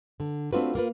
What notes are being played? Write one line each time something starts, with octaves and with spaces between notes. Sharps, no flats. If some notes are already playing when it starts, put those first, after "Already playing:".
D3
A3 C4 D4 F4 F#4 B4
A#3 F4 B4